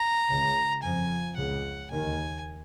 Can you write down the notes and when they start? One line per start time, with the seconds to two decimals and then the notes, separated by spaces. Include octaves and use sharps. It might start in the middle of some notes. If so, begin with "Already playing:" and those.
Already playing: A#5
0.29 C#2 C#3
0.83 F2 F3 G#5
1.37 C#2 C#3 F#5
1.91 D#2 D#3 G#5